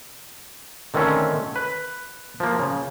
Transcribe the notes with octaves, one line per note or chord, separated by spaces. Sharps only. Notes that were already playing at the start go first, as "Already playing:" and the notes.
D3 D#3 A3 C4 C#4
B4
F3 A#3
C#3